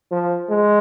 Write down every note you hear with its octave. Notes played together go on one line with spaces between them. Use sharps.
F3
G#3